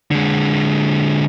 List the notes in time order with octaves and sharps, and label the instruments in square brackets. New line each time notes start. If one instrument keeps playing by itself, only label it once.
[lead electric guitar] D3 G#3